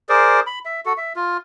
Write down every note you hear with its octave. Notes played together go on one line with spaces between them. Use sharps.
G#4 A#4 C5 D5
B5
E5
F#4 A4
E5
F4